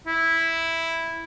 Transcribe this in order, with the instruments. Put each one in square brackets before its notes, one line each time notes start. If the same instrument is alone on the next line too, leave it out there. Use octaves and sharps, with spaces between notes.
[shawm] E4